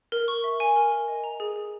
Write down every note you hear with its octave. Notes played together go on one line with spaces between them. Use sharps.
A#4
C#6
E5
G#5
A#4
A#4
D#5
A#5
G#4
G#4